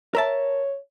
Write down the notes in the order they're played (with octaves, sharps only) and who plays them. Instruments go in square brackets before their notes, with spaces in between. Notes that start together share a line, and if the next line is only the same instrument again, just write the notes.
[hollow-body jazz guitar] A#4 E5 A5 [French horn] C#5